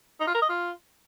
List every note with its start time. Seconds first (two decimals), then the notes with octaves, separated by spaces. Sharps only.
0.20 D#4
0.27 F4
0.35 A#4
0.42 D#5
0.49 F4